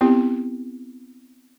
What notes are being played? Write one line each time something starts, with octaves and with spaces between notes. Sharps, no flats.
B3 C4 E4 G4